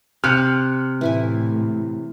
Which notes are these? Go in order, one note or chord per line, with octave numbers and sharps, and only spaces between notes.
C3 F6 F#6 C#7
A2 E3 E4 G#5